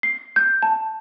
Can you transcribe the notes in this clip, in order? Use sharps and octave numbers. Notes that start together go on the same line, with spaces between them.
C7
G6
A5